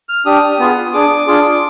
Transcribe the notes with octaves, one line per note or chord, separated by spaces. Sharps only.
F6
D4 G4 D#6
B3 F4 G#4
D4 G#4 D6
D4 F4 G#4